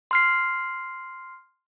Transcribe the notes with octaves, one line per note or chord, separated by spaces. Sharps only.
C6 F6 C7